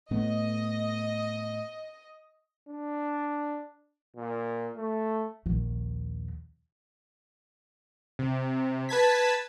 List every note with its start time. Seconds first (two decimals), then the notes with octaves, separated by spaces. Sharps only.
0.11 A2 A3 B3 D#5
2.69 D4
4.16 A#2
4.76 A3
5.46 A#1 D#2
8.19 C3
8.89 B4 A5 G#6 B6